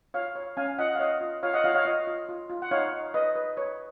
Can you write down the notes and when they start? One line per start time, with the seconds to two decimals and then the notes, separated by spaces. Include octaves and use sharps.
0.14 F4 C#5 F5
0.36 C#5
0.57 C#4 F5 G#5
0.79 F4 D#5 F#5
0.95 F5
0.99 C#5 D#5
1.21 F4
1.43 F4 C#5 F5
1.54 D#5 F#5
1.64 F4 C#5 F5
1.74 C#5 F5
1.85 F4 D#5
2.07 F4
2.29 F4
2.50 F4
2.62 F#5
2.71 D#4 C#5 F5
2.93 D#4
3.14 B4 D#5
3.36 B4
3.57 B4 C#5